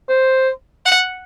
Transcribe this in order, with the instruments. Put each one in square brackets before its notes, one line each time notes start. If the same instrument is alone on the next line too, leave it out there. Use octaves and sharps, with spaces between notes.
[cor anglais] C5
[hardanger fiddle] F#5